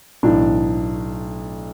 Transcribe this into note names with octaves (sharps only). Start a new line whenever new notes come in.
B1 A2 E3 D4